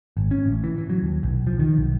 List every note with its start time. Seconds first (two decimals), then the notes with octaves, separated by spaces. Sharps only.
0.17 G#1
0.31 C#4
0.46 A1
0.64 E3
0.78 E3
0.90 F#3
1.03 D#2
1.23 B1
1.47 F3
1.59 D#3
1.77 B1